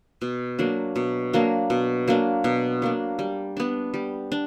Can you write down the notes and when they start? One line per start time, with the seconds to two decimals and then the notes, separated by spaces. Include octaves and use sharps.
0.21 B2
0.59 F#3 A#3 D4
0.96 B2
1.33 F#3 A#3 D4
1.70 B2
2.08 F#3 A#3 D4
2.44 B2
2.82 F#3 A#3 D4
3.19 G3
3.57 B3 D4
3.94 G3
4.32 D4